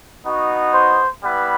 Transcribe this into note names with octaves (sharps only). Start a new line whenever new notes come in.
B3 D#4 F#4
C5
G3 B3 E4 B4